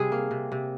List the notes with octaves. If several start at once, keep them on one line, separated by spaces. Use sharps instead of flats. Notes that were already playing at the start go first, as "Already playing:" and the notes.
Already playing: C3 G3 G#4
A#3
C3
C3